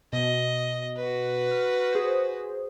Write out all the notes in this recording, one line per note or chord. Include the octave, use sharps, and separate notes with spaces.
B2 D#5
F#4 B4
F6
G#4 C5